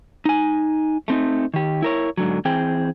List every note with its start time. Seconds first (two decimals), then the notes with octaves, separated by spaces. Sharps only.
0.25 D#4 G#5
1.08 A3 C4 D#4
1.54 D#3 G4
1.82 E4 A#4 C#5
2.17 G#2 D3 F#3
2.45 E3 C4 G#4 G5